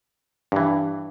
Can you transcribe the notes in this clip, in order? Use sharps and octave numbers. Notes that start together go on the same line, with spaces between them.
G2 E3